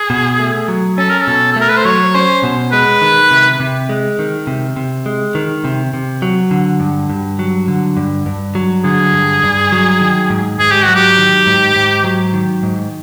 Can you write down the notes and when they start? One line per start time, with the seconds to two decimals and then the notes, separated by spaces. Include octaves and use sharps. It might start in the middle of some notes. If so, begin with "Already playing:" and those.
Already playing: G#4
0.10 B2
0.40 A3
0.68 F#3
0.98 C#4 A4
1.09 A#4
1.20 A4
1.27 B2
1.53 A4
1.56 A3 A#4
1.69 B4
1.77 C5
1.85 F#3 C#5
2.15 C#4 C5
2.43 B2
2.72 G#3 B4
3.02 D#3
3.31 C3
3.60 C3
3.89 G#3
4.19 D#3
4.47 C3
4.77 C3
5.06 G#3
5.35 D#3
5.65 C3
5.94 C3
6.22 F#3
6.51 D3
6.80 G2
7.10 G2
7.39 F#3
7.68 D3
7.97 G2
8.26 G2
8.55 F#3
8.84 D3 G#4
9.13 G2
9.43 G2
9.72 F#3
10.01 D#3
10.30 G#2
10.59 G#2 G#4
10.71 G4
10.84 F#3 F#4
10.96 G4
11.18 D#3
11.47 G#2
11.76 G#2
12.05 F#3
12.33 D#3
12.63 G#2